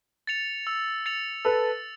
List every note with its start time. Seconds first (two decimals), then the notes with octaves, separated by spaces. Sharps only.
0.27 A6 C#7 F7
0.67 E6
1.06 A6 C#7 F7
1.45 A4 B4 E6